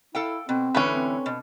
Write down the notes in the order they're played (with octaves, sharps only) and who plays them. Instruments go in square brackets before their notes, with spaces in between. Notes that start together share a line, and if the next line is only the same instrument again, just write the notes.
[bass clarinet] E4 [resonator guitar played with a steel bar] A4 F5 G5
[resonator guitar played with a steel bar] B2 [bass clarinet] C4
[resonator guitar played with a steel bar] A2 D3 E3 [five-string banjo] C#4 B4
[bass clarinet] C4
[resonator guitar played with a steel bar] B2